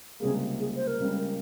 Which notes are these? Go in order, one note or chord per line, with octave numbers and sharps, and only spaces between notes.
C#2 C3 G3 A#3 G#4
G#4
C5
A#4
C#2 C#3 G3